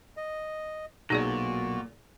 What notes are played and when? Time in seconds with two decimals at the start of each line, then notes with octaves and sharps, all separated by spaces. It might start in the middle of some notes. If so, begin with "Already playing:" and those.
0.17 D#5
1.10 B1 A#2 D#4 F#4 G#4 D5